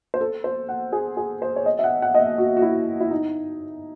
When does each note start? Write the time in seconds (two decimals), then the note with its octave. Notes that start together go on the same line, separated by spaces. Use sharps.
0.14 C5
0.21 A4
0.44 C5
0.69 F#5
0.93 G#4
1.17 G#4
1.42 C5
1.56 C#5
1.66 D#5
1.79 E5
1.84 F#5
2.02 F#5
2.15 D#5
2.20 E5
2.38 F#4
2.57 F#4
2.62 E4
3.00 E4
3.11 D#4